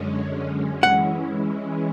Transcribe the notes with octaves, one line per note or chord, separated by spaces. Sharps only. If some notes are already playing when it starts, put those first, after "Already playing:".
Already playing: F#2 D3 G#3 C#4
E3 G#3 C#4 E4 F#5